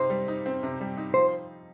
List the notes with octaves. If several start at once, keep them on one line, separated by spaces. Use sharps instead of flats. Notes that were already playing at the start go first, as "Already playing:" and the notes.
Already playing: C3 C4 D#4 C5
G3
D#4
C4
C3
G3
D#4
F3 C5